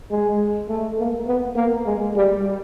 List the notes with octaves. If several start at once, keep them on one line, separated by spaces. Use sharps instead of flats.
G#3
A3
A#3
B3
A#3
G#3
G3